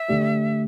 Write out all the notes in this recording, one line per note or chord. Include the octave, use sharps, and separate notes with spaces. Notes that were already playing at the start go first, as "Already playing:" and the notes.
Already playing: E5
D3 A3 G4 D5